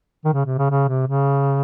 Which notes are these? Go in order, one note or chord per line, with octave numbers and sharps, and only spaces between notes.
D#3
C#3
C3
C#3
C#3
C3
C#3